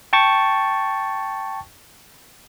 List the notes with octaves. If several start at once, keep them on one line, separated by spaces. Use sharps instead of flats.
G5 A5 C#6 A6